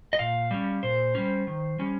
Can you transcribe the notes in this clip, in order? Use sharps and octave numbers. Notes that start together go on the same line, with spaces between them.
D#5
A#2 F5
G3 C#4
A#2 C5
G3 C#4
D#3
G3 C#4